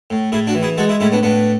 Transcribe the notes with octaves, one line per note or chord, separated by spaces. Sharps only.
A2
A2 E4 G#4
D4 F#4
E3
E4 G#4
G#3 F#4 A4
E4 G#4
A2 C#4 E4
B3 D4
A2 B3 D4